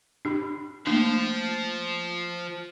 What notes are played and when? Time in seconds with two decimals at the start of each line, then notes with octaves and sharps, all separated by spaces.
0.25 D4 G4 B5
0.87 F3 A3 A#3 D4